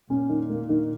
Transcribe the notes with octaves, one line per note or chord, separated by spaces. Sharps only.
A#2 C#4
D#3
A#3
D#3